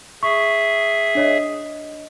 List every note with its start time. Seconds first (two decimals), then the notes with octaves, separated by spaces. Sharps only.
0.23 G#4 E5 C#6
1.15 D4 C#5 D#5